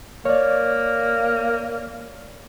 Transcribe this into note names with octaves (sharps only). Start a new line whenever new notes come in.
A#3 C#5 D5